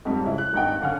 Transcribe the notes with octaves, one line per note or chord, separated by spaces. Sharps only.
F2 G#2 G3
C#3 G#3 E4
F#6
G#1 G2 D#4 F#5 G5
F#2 D3 F5 F#5 G#5 F6